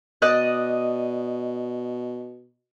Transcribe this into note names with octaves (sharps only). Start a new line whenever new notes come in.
B2 D5 D#5 F#6